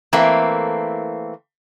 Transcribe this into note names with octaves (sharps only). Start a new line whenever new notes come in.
E3 A3 A#3 C4